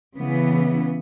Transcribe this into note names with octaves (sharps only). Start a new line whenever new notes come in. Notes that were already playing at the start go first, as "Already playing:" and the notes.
C#3 E3 B3